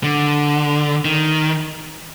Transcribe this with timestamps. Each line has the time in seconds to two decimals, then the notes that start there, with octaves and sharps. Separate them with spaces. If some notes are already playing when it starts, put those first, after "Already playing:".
0.03 D3
1.05 D#3